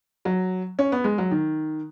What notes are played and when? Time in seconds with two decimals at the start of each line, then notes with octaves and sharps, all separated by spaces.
0.25 F#3
0.79 C#4
0.92 B3
1.04 G#3
1.18 F#3
1.31 D#3